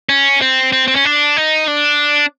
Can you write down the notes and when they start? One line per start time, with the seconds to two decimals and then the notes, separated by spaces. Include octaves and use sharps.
0.09 C#4
0.42 C4
0.73 C4
0.88 C4
0.95 C#4
1.05 D4
1.37 D#4
1.68 D4